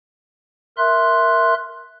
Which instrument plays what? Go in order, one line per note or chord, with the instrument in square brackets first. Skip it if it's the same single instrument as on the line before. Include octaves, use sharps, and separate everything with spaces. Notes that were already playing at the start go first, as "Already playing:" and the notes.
[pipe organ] A#4 E5 C6 F#6